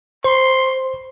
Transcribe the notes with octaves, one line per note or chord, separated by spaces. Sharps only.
C5 C6